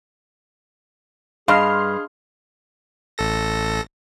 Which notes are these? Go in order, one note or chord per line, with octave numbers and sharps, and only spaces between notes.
G2 G#4 D#5 F5 C6 F6
A1 A4 A#6